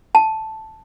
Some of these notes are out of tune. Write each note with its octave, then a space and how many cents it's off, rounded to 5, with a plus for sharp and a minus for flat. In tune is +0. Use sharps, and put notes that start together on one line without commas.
A5 -5